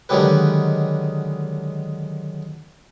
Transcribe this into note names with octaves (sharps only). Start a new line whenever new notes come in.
D3 D#3 F#3 G#3 G4 B4